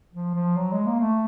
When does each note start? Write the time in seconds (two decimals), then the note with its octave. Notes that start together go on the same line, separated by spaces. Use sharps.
0.13 F3
0.35 F3
0.57 F#3
0.72 G#3
0.86 A#3
1.00 A3